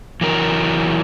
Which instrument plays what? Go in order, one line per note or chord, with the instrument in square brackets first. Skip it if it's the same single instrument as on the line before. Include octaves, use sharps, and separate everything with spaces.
[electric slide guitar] E3 F#3 A#4